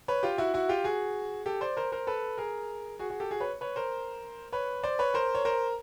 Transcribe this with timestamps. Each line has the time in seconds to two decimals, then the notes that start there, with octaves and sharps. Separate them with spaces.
0.08 B4 C#5
0.23 F4 G4
0.38 E4 F#4
0.54 E4 F#4
0.69 F4 G4
0.84 F#4 G#4
1.46 G4 A4
1.61 C5 D5
1.77 A#4 C5
1.92 A#4 C5
2.07 A4 B4
2.38 G#4 A#4
2.99 F#4 G#4
3.10 F#4 G#4
3.20 G4 A4
3.31 F#4 G#4
3.40 B4 C#5
3.61 B4 C#5
3.76 A#4 C5
4.53 B4 C#5
4.83 C5 D5
4.99 B4 C#5
5.14 A#4 C5
5.35 C#5
5.45 A#4 C5